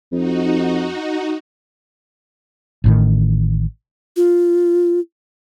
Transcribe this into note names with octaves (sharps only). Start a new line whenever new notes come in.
F2 D#4 F#4
A1 A2 D#3
F4